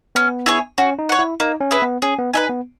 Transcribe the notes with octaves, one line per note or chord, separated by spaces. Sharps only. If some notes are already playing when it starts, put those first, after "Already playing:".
B3 C#4
E4 G#4 C#5
C#4 F#4
D#4
C#5 F#5
E4
A#3 D#4
C#4
E4 G#4 B4
B3
C#4 G#4
B3
D#4 B4 E5 G#5
B3